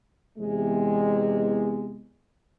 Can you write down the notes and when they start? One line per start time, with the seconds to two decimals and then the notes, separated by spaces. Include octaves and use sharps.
0.38 E2 C3 G#3